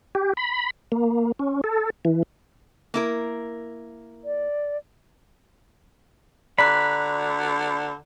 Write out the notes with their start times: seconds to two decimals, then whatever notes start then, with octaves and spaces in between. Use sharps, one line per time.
0.15 G4
0.37 B5
0.92 A#3
1.39 C#4
1.64 A4
2.05 E3
2.94 A#3 E4 A#4
4.24 D5
6.59 D3 D5 A#5 B5 F#6